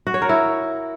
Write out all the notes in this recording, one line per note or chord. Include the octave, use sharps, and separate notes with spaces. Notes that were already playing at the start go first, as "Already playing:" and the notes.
F#4
C#5
A#4
E4